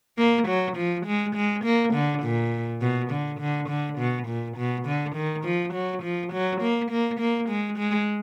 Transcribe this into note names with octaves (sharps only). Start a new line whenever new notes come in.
A#3
F#3
F3
G#3
G#3
A#3
D3
A#2
B2
D3
D3
D3
B2
A#2
B2
D3
D#3
F3
F#3
F3
F#3
A#3
A#3
A#3
G#3
G#3